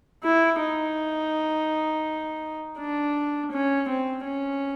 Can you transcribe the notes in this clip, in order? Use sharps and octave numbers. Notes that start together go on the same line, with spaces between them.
E4
D#4
D4
C#4
C4
C#4